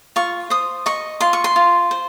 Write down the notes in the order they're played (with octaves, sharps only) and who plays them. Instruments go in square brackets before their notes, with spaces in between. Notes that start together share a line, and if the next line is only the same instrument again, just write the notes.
[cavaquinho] F4 C#6
C5 D#6
D#5 C#6
F4 C6
C#6
C6
F4
C5